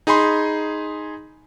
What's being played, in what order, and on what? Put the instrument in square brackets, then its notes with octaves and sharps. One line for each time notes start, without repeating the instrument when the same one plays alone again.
[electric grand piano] D#4 G#4 G#5 B5 C6